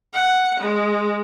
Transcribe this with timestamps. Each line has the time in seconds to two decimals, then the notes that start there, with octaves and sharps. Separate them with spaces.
0.14 F#5
0.60 G#3